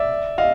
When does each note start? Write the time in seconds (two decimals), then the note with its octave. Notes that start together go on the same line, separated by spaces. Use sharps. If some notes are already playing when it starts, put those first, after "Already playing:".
Already playing: D5 E5
0.38 D#5 F5